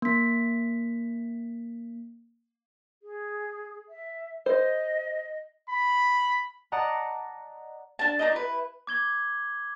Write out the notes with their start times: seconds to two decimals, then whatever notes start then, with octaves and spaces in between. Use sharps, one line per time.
0.02 A#3 B6
3.03 G#4
3.89 E5
4.46 C5 D#5
5.70 B5
6.72 D5 D#5 F#5 A5 A#5 D#6
7.99 D4 A5
8.19 D4 D#4 D#5
8.32 E4 B4
8.87 D6 G#6 G7